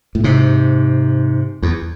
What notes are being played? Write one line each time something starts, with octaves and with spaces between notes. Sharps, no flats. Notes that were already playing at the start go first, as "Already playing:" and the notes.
A2
G#2 C3
E2